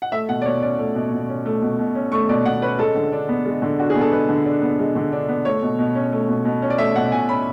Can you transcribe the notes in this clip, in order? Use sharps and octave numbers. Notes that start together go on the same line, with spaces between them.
F#5
A3 E5
B2 F#5
D5
B2 C#5
C#4 D5
A3
B2
B2
C#4
A3
B2
B2
C#4
A3 C#6
B2 D5
B2 F#5
C#4 B4
G#3 A4
D3
D4
B3
G#3
D3
D4 F#4
G#4
B3
A4
G#3 B4
D3
D4
B3
G#3
D3
D4
B3
A3 C#5
B2
B2
C#4
A3
B2
B2
C#4
D5
A3 E5
B2 F#5
B2 G#5
C#4 B5